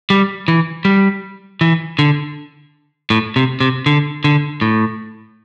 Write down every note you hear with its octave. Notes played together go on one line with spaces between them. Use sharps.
G3
E3
G3
E3
D3
A2
C3
C3
D3
D3
A2